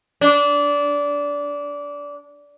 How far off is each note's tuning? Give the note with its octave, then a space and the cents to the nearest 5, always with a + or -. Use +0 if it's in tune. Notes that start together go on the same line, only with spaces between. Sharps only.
D4 -20